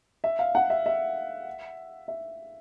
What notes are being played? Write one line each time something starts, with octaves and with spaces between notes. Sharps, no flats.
E5
F5
F#5
E5
E5
E5